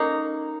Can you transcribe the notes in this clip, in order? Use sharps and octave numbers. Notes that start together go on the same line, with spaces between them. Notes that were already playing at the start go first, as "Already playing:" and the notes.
Already playing: A#3 C#4 D#4